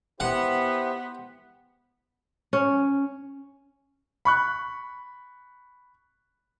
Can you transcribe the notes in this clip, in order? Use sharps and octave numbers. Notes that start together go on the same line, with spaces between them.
B3 E4 G4 C5 F#5
C#4
B5 C#6 F#6